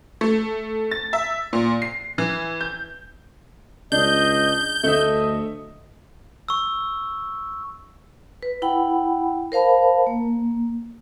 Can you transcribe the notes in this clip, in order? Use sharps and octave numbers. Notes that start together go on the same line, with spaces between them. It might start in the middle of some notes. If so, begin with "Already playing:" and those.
A3
A6
E5
A#2
C7
E3
G6
C#2 D4 D#5 G6
D2 A3 D#5 E5
C#6 E6
B4
E4 F#5 G5 B5
A#4 C5 F5 A5 B5
A#3